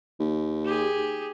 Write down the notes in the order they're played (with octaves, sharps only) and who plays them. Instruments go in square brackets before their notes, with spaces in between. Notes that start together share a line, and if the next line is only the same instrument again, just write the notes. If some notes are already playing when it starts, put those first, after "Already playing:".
[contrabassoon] D#2
[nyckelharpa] G4 G#4